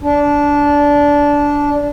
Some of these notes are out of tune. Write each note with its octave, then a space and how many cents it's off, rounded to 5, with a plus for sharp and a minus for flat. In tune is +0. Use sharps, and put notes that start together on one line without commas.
D4 -15